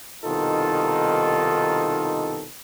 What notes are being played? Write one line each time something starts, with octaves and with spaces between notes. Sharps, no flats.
C2 B2 D#3 D#4 F4 A4